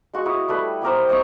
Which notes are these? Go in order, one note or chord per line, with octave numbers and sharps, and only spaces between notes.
G#3 F#4 C#6
E4 F#4 D#6
G3 A3 B4
B3 G4 A#4 C5
C4 D#5 G5 C#6